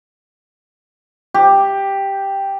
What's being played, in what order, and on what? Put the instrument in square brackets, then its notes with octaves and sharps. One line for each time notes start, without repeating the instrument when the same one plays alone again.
[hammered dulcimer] G4